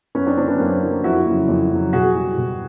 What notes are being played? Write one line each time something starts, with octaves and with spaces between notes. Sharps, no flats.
F#2 B3 C#4
C4 D4
D3 F#3 C4 D4
B3 C#4
F#2 A#3 C4
D3 F#3
F2 E4 F#4
C#3 F#3
F2
C#3 F#3
B2 F#4 G#4
G3
B2